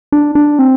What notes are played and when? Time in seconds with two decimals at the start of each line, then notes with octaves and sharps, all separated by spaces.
0.12 D4
0.35 D4
0.59 C4